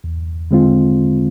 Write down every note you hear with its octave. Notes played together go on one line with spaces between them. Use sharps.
E2
D3 G#3 C4 F4